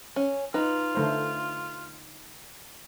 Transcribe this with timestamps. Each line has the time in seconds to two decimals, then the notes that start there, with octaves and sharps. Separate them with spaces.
0.16 C#4
0.54 D#4 F4 B4
0.95 D3 A3 C5